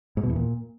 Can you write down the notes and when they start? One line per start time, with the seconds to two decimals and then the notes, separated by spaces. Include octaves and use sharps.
0.17 G#2
0.23 B2
0.30 E2
0.36 A#2